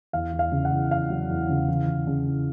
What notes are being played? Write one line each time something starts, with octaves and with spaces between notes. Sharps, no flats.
E2 F5
E2
F5
C#3
F#5
E2
E2 F5
F#3
E2
C#3
E3
E3
C#3
E3